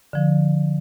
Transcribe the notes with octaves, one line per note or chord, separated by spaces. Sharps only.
D3 F3